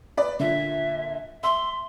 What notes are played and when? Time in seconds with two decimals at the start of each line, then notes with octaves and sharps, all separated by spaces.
0.17 B4 D5
0.40 A#2 D3 E5
1.43 E5 C6